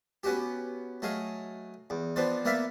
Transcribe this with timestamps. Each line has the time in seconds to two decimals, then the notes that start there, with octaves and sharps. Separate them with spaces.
0.24 B3 C#4 F#4 G4
1.02 F#3 A3 G#4 D#5 F5
1.90 E2
2.16 F3 B3 C4 D4 C5 D5
2.45 A#3 B3 D5 E5 F5 B5